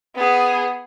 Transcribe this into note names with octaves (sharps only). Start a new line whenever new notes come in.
B3 G#4